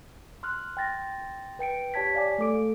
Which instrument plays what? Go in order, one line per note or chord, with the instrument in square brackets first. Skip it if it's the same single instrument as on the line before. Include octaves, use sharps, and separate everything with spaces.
[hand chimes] C6 F6 F#6
G5 C6 A6 A#6
B4 G5 C#7 D7
G4 C#5 A5 G#6 B6
D5 F5 G#5 D6
A3 A4 D6 D7